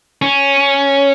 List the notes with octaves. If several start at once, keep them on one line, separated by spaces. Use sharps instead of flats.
C#4